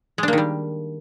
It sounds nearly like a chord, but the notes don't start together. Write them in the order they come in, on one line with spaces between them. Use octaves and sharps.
G#3 D4 A#3 D#3 G3